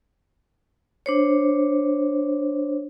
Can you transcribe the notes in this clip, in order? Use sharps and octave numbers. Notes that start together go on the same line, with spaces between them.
D4 C5 C#5